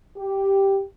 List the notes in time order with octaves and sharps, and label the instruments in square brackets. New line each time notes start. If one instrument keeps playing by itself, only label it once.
[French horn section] G4